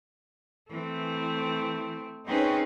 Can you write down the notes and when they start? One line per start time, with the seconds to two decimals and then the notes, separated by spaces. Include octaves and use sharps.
0.71 E3 A3 C4
2.26 C4 C#4 D#4 G#4 B4